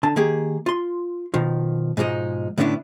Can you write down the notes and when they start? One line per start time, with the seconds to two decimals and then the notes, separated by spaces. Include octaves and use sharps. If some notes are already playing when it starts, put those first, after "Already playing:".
0.03 D3 A5
0.16 D#3 A#3 G4 G#4
0.66 F4 C6
1.34 B2 D#3 F3
1.97 G#2 B2 F3 G#3 D#4
2.58 A2 D3 B3 C#4 D4 E4